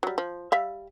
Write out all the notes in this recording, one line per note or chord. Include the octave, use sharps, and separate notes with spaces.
F#3 G3
F3
G3 E5 F5